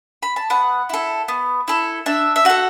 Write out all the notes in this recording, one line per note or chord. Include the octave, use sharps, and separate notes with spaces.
B5
A5
B3 F#5
E4 A4
B3
E4 A4
D4 E5
E5
F#4 A4 F#5